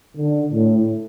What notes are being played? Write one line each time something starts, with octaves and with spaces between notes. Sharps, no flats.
D3
A2